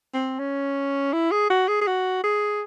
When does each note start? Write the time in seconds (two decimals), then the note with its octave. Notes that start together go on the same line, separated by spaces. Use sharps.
0.14 C4
0.39 C#4
1.13 E4
1.31 G#4
1.50 F#4
1.68 G#4
1.81 G#4
1.87 F#4
2.24 G#4